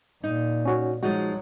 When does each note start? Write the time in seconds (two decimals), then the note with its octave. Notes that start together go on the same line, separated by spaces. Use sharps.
0.24 A#2 D#4
0.65 C#4 F#4 C#5
1.03 F3 F#3 G#3 D#4 F#4